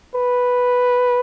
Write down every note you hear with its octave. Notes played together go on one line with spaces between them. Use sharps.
B4